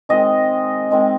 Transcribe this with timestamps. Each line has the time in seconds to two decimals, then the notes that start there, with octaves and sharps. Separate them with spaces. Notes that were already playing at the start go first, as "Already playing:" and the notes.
0.09 D#3 G#3 C4 D#5
0.91 D#3 G#3 C4